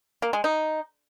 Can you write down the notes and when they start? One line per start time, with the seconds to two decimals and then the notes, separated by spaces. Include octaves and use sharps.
0.22 A#3
0.33 G#3
0.44 D#4